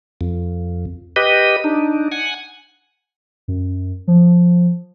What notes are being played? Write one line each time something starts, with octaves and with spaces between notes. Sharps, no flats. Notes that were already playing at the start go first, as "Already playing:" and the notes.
F2
G4 B4 D#5
D4 D#4
F#5 G#5
F#2
F3